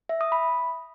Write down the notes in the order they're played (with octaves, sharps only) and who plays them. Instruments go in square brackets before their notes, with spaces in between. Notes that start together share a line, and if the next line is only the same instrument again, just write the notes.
[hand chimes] E5
D#6
B5